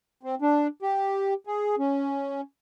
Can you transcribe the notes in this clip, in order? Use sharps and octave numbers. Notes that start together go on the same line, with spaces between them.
C4
D4
G4
G#4
C#4